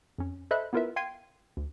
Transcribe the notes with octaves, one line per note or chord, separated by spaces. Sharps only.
F2 C#4
A4 C5 D#5 E5 B5 F#6
B3 E4 F4 A#4 B4 E5
F5 G5 C6 G#6 C7 D#7
D2